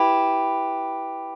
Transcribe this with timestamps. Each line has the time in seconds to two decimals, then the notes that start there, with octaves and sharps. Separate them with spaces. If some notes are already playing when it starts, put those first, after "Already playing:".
Already playing: E4 G4 B4